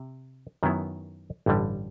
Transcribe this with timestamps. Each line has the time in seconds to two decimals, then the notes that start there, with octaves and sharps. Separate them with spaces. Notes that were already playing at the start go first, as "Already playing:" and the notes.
Already playing: C3
0.63 F#2 D#3 F#3 B3 E4
1.46 A1 G2 D3 G3